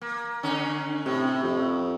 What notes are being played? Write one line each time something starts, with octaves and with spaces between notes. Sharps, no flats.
A#3
D3 C#4 D#4
A2 C3
F2